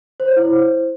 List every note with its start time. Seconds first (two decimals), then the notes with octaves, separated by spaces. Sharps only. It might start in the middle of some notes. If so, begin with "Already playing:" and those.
0.20 C5
0.28 C#5
0.36 E4
0.45 C5